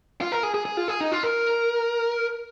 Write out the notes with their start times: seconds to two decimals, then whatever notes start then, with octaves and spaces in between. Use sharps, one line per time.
0.21 F4
0.32 A#4
0.43 G#4
0.54 G#4
0.65 G#4
0.77 F4
0.88 G#4
1.01 D#4
1.12 F4
1.23 A#4